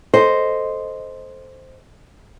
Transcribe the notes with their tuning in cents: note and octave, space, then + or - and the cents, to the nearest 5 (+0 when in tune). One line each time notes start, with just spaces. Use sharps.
A4 +0 C5 +0 D#5 +0